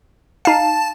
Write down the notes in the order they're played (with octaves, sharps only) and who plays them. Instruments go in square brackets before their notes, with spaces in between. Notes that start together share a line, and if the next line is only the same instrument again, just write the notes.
[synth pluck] D#4 F5 [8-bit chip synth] A5